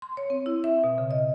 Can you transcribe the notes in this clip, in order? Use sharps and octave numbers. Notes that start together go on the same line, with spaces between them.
C6
C#5
C4
E4
E5
B2
C#3
D#5